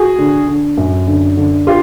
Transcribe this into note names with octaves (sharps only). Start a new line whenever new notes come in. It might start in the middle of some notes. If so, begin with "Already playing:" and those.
Already playing: F#4 G#4
D3
D3
F#2
D3
D3
F4 G4